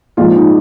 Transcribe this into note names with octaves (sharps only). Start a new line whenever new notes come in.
A#1 G#2 F3 F4
D#4